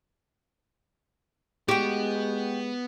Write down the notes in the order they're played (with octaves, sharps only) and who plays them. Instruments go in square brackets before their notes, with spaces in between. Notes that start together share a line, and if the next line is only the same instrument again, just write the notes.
[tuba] G#3 [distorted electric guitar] B3 [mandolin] F#4 G5 [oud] G4